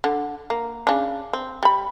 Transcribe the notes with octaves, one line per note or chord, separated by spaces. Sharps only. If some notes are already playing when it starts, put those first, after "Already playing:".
D3
A#3
C#3 D4
C4
G3 B5